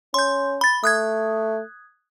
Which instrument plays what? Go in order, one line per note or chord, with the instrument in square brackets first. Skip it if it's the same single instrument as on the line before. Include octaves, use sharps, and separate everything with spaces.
[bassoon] C#4 [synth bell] C6 G6
[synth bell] B5 A6
[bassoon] A3 [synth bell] D#6 F#6 G#6